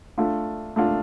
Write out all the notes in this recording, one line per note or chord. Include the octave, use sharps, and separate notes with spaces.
A3 D4 F4
A3 D4 F4